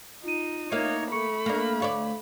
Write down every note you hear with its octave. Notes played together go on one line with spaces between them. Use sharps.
D#4 F4 D#7
A#3 D#4 C#5 E5 F5
A3 B5 C#6 C#7
A#3 D4
D2 C#5 D5 F5